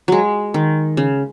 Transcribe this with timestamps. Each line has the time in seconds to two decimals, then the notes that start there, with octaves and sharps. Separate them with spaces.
0.08 F#3 G#3
0.54 D#3
0.97 C#3